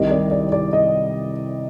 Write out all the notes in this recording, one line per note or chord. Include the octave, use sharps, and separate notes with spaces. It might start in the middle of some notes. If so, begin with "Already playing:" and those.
Already playing: C2 C3 D#3 G3 D#5
D5
D5
D5
D#5